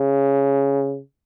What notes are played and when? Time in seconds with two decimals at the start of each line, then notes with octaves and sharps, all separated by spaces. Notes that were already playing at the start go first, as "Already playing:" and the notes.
Already playing: C#3